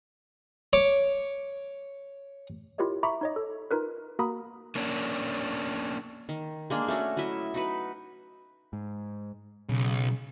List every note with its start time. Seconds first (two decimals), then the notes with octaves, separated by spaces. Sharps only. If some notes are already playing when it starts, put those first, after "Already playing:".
0.73 C#5 D6
2.78 E4 F4 G4 A#4 C#5 D#5
3.03 E5 A#5 B5 C#6 D6
3.21 D#4 C#5 D#5
3.36 A4
3.71 D#4 F4 A#4 B4
4.19 A#3 F#4 A#4 A#5 B5 D#6
4.76 A#3 C#4 D4
6.29 D#3
6.70 G#3 A#3 D4 G#4
6.88 A3 C#4 D4 F#4
7.17 F#3 E4 D#5 E5
7.54 D#4 F#4 B4
8.73 G#2
9.69 B1 C#3